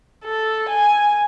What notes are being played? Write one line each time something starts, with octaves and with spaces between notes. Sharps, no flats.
A4
G#5